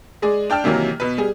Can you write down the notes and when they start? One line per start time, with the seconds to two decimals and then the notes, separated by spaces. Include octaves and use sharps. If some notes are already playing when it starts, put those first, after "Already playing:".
0.22 G#3 G#4 D5
0.50 D4 G5 A5 F6
0.64 C3 D#3 E3 F#3 A#3
1.00 B2 B4
1.18 G3 G#4